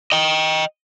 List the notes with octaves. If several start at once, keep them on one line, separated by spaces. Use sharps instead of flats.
D#5 G5